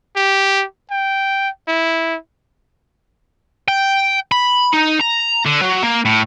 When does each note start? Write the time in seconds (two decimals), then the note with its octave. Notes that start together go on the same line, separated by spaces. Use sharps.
0.16 G4
0.91 G5
1.68 E4
3.68 G5
4.32 B5
4.74 D#4
5.01 A#5
5.46 D3
5.61 F#3
5.83 A#3
6.05 A2